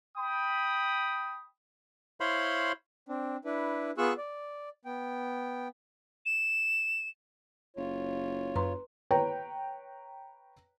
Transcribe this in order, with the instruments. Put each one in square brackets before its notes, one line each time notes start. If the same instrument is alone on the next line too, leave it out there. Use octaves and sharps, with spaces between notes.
[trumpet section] G5 B5 D#6
[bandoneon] E4 C5 C#5 F5 B5 C6
[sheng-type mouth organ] C4 D4
D4 E4 B4
B3 F4 G#4 C#6 E6 F#6
D5
B3 G5
[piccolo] E7
[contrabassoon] F#1 [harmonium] F4 C#5
[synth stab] F#2 [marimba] B4 A#5 C6
[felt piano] B4 C#5 G5 A#5